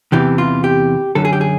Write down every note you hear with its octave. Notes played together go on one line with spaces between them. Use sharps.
E2 C3 E3 G4
F4
G4
F#2 D3 A4
G#4
G4
G#4